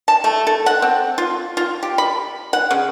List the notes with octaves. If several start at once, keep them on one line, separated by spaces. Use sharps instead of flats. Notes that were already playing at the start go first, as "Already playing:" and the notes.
A5
A3
A4
F#5
C4
F4
F4
G4
B5
F#5
C#3